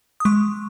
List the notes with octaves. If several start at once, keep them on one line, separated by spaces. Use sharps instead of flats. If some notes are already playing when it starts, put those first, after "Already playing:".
D#6
G#3 C#6